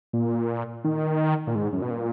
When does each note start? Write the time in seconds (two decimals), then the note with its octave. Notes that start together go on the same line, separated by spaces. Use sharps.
0.13 A#2
0.84 D#3
1.47 A#2
1.55 G#2
1.73 F#2
1.82 B2
1.91 A#2